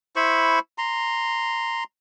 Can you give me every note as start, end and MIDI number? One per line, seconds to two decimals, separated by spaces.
0.16 0.59 64
0.16 0.59 72
0.16 0.59 83
0.16 0.59 85
0.78 1.84 82
0.78 1.84 84